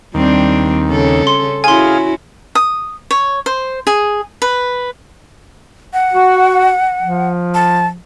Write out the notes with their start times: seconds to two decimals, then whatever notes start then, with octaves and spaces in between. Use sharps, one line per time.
0.14 D#2 G3 C4 D4
0.88 C#3 C#4 A4
1.27 C6
1.64 C#4 E4 F#4 G#4 F5 G#5 C6
2.55 D#6
3.11 C#5
3.46 C5
3.87 G#4
4.42 B4
5.93 F#5
6.13 F#4
7.01 F3
7.54 A5